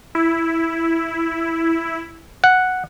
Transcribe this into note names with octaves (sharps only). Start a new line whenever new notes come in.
E4
F#5